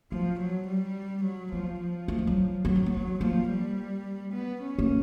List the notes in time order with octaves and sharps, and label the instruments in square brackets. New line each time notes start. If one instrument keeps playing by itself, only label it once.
[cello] F3 [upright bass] B3
[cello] F#3
G3
F#3
[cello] F3 [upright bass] B3
[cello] F3
[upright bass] A3
G#3
F#3
[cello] F#3 [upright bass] B3
[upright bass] C4
B3
[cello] F#3
[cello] F3 [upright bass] A#3
[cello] G3
B3
C#4
[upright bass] A#3